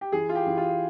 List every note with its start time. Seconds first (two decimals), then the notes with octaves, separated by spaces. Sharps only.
0.01 G4
0.12 E3 G#4
0.29 F4
0.35 G4
0.47 E3
0.57 F4